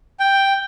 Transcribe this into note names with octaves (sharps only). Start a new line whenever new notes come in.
G5